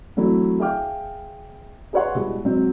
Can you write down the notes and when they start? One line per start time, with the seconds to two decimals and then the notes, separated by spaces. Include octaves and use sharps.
0.17 E3 F#3 A3 C4 E4
0.60 G#4 E5 F5 G5 D6 F6
1.93 G#4 B4 C#5 F#5 C6
2.15 B2 G3 G#3 E4 F#4
2.45 G#2 B2 F#3 C4